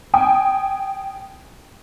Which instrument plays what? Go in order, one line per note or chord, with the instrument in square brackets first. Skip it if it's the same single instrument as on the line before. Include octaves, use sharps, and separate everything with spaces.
[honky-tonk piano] G5 G#5 D#6